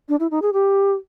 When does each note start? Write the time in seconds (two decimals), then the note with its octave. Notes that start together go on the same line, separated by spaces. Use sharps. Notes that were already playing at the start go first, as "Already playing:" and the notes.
0.09 D4
0.20 E4
0.31 D#4
0.42 G#4
0.53 G4